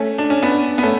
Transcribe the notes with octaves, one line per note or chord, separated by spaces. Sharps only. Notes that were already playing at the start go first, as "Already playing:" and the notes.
Already playing: A3 C#4
D4
C#4
B3 D4
B3
A3 C#4